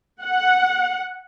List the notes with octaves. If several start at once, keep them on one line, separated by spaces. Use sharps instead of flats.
F#5